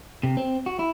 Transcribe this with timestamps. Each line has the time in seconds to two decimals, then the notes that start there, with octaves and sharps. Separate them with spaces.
0.23 C3
0.37 C4
0.66 F#4
0.79 E4